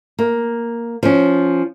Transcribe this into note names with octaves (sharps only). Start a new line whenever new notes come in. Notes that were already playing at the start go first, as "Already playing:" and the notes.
A#3
F3 C#4